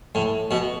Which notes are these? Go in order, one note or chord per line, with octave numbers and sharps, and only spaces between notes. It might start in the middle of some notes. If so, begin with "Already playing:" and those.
A2
B2